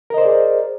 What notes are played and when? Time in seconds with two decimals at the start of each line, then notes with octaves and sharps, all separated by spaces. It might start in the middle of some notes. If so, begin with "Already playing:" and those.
0.10 A#4
0.14 D#5
0.18 C5
0.22 D5
0.25 G#4